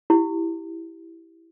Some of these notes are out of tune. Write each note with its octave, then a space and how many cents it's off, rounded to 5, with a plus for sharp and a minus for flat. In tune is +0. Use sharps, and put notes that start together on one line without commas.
E4 +0 G4 +0